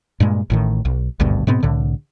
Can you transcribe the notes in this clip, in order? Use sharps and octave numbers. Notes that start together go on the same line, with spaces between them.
G2 A#2 G#3
A1 A2 D#3
B1
G#1 D2 G2 B2
G#2 B2 B3 C4
C2 A2 D3